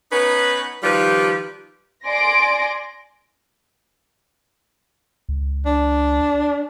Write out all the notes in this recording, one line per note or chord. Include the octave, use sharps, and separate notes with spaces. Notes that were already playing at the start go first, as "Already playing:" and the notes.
B3 C#4 D#4 B4
D#3 F3 G3 F4 G4 B4
D5 G#5 C6 A#6 D7
C#2
D4